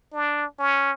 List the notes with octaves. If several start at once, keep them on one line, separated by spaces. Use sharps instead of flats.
D4
C#4